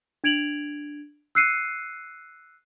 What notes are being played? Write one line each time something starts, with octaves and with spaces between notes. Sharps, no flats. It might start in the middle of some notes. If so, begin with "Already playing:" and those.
D4 G#6 D7 F7 F#7
E6 F#6 C7 C#7 D#7